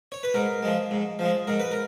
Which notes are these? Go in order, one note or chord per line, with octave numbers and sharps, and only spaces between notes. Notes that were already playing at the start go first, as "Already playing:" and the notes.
C#5
B4
G#2 A#4
F3 G#3
G#2
F3 G#3
G#2 A#4
B4
A#4